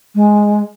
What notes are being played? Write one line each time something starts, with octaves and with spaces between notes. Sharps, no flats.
G#3